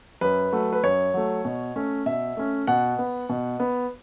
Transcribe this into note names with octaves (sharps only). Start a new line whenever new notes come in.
F#2 B4
F#3 A3
B4
F#2 C#5
F#3 A3
B2
A3 C#4
B2 E5
A3 C#4
B2 F#5
B3
B2
B3